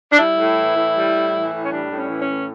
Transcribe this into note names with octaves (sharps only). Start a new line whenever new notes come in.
D4
G3 E4
A2
E3
A2
G3
A2
E3
A2
C#4
G3 D4
A2
C#4
E3
C#4
A2